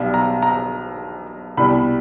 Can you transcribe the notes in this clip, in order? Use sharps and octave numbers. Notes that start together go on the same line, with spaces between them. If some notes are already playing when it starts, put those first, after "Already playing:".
Already playing: B1 B2 G3
A#5
A#5
C2 B2 G3 B5